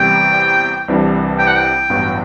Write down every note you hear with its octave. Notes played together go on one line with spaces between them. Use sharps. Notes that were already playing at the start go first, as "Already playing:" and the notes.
Already playing: E2 C3 G3 G5
C2 C3 E3 G3 D4
G5
F#5
G5
A1 G2 F#3 B3 F#4